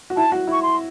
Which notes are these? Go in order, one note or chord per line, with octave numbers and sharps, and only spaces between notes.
F#4
E4 A5
F#4
E4 C#6
C6